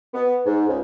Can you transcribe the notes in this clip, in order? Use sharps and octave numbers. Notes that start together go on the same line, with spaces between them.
B3
G#2
C#2